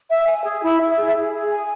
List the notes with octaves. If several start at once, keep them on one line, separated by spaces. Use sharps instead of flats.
E5
G#5
G#4
E4
E5
G#4
G#4
G#4
G#5